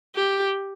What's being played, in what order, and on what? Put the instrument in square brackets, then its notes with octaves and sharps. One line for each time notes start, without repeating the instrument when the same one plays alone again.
[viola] G4